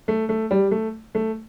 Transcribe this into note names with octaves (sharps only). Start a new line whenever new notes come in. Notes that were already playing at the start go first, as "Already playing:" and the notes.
A3
A3
G3
A3
A3